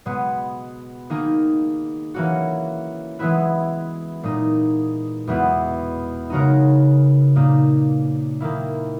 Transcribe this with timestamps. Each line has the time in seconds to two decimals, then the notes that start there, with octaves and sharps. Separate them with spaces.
0.06 B2 G#3 B3
1.10 D#3 A#3 D#4 G#4
2.14 E3 A#3 C#4 F#4
3.19 E3 G#3 B3 E4 B4
4.23 A#2 G#3 D#4
5.27 E2 B2 G#3 B3 E4
6.30 C#3 G#3 D#4 F#4 A#4
7.36 A#2 A#3 D#4
8.40 D#3 A#3 E4